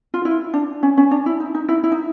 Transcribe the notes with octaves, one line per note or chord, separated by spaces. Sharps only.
F4
E4
D4
C#4
C#4
D4
E4
D#4
D#4
E4
E4
D#4